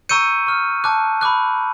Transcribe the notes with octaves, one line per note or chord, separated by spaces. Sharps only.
A#5 C#6 E6 G6 C#7 D#7
C#6 F6
A5 D6 F#6
B5 D6 F#6